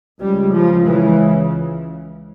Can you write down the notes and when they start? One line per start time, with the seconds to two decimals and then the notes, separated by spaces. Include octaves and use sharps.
0.20 C#2 C#3 G3
0.53 F3
0.84 C#2 C#3 E3